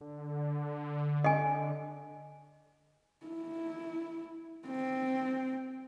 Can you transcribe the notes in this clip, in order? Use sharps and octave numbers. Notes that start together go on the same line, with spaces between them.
D3
D#5 G#5
E4
C4